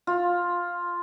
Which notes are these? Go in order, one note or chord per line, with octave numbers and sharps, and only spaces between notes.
F4